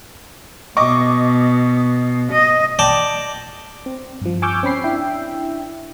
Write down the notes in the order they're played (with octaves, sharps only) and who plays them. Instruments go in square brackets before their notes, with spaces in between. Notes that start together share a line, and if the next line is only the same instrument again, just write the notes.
[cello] B2 [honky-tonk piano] D#5 C#6 D6
[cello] D#5
[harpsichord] D5 G5 A5
[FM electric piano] C4
G2 F3
G#5 C#6 D6 E6 F6 G6
C4 C#4 B5 C7
D4 E4 E5 G5